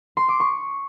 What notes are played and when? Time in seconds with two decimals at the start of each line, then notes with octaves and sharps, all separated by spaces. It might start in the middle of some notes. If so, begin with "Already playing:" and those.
0.17 C6
0.28 D6
0.40 C#6